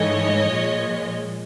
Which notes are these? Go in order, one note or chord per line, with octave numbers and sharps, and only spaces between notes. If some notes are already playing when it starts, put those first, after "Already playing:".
Already playing: G#2 E3 A3 C#5 D#5
A#2 F3 G#3